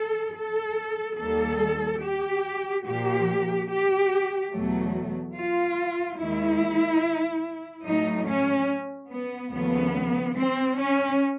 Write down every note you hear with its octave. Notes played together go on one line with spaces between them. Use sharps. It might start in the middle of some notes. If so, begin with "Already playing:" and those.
Already playing: A4
A4
D#2 D#3 G3 A#3 A4
G4
A#2 F3 A#3 G4
G4
E2 B2 F#3 A3
F4
D#2 D#3 G#3 E4
A2 F#3 A3 D#4
C#4
B3
D#2 C#3 F3 A3 B3
C4
C#4